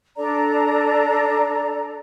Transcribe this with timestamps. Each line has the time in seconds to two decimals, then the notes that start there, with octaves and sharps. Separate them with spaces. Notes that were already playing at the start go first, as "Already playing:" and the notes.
0.16 D4 A4 D5 A#5